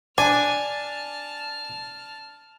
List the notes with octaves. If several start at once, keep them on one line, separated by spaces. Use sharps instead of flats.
D4 G#5 A5 F6